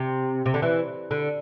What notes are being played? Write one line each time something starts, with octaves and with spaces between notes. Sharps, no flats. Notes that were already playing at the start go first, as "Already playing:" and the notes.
Already playing: C3
C3
D3
E3
D3